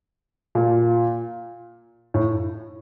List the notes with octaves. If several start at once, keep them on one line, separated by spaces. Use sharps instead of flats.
A#2
A2